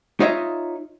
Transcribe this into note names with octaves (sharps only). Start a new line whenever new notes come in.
D#4 F4 C#5 D#5 E5